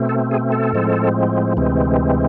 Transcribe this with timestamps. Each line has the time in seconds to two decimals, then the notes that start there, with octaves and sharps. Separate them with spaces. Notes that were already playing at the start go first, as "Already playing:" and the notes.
Already playing: B2 A3 C4
0.09 A4
0.31 G#4
0.52 A4
0.73 A2 F3 G#3 C4
1.57 D2 C3 E3 G#3 C4